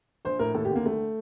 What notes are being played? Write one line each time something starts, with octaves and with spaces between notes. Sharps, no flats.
A#1 C5
A2 A#4
D#2 A4
G4
D3
A#3
C2 A3